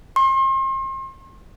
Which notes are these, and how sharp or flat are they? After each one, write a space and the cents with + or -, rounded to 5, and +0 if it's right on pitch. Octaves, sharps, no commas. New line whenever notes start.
C6 +40